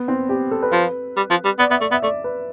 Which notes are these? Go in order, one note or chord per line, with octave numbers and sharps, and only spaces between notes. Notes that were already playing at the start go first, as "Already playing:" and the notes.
Already playing: B3
C4
G4
A4
B4
F3
G3
F3
G3
B3 D5
B3 E5
A3 D5
B3 E5
A3 D5
B4